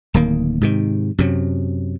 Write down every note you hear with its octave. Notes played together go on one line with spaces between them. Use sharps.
D1 D#3 A#3
G#2 C3 D#3
F#2 C3 F#3